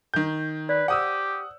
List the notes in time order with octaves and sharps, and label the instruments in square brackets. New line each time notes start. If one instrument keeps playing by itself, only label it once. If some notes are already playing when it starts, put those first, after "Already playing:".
[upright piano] D#3 G6
[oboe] B4 [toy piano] D5
[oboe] G4 [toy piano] C5 [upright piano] F#5 D#6 E6